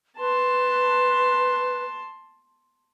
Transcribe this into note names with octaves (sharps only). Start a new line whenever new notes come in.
B4 A5 C6